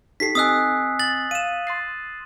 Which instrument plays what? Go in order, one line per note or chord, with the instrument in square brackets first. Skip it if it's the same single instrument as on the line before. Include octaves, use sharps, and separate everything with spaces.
[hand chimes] D#4 G4 A4 [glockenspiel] B6 C7
[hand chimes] C4 D#5 G#5 [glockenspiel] D#6 E6 F#6
[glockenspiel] A6 F#7
[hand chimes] F5 [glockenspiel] D#7 E7
[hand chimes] C6 A6 C7